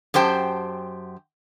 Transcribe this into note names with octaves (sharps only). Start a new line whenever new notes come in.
F#2 G4 C5 G5 A5